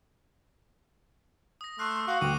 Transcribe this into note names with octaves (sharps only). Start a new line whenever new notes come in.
D#6 A#6
A3 C6 F6 F#6 C7
F#4 F5
D2 G5 D6 D#7